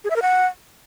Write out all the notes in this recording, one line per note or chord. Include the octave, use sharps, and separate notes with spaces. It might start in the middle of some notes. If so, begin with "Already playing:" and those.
G#4
E5
A#4
F#5